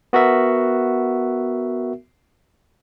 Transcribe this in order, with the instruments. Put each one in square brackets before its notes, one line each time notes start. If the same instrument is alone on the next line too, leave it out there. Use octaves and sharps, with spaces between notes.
[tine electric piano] B3 F#4 A#4 E5